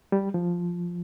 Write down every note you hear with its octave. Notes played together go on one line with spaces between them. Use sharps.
G3
F3